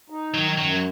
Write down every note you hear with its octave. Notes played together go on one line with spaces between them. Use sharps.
D#4
D#3 F#3
F#2 F#3